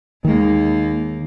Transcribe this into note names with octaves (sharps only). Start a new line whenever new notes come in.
D#2 D#3 G#3 A#3